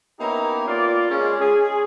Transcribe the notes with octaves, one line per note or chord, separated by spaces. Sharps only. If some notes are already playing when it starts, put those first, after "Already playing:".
A#3 B3 C#4 D#4 E4 G4
A#3 F4 D5
G#3 C#4 F4
G#4